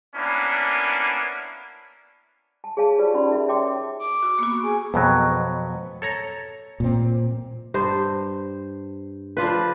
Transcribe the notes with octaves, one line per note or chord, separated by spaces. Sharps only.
A#3 B3 C#4 D4 E4
A5
G#4 C#5 F5 A5
F4 G4 B4 C5 D5 A5
C#4 D#4 F#4 D5 B5
A#4 E5
C#5 E5 G5 A5 C6 D6
D6
F#4 E6
A#3 B3 F#4
B5 C#6 D#6
G#4
F2 B2 F#3 B3
A4 C#5 A#5
A#2 C4
G2 C5
F3 D4 F4 B4